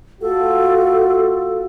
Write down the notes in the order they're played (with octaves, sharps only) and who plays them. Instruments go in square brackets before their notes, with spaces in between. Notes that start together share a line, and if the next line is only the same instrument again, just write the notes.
[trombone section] A3 F4 F#4 [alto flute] A4